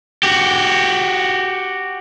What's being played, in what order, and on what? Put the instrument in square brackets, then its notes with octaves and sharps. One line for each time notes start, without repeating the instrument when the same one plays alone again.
[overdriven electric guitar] F#4 G4